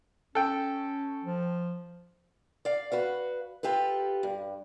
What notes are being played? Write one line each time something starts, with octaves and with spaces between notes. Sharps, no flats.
C#4 A4 G5
F3
D5 F5
F#4 B4 F5
F4 G4 A4 B4
G2